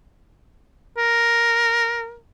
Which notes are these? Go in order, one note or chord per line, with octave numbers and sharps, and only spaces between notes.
A#4